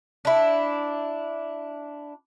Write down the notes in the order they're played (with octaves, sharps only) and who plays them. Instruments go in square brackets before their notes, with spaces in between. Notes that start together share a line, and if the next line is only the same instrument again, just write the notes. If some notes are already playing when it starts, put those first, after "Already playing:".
[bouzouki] D4 E4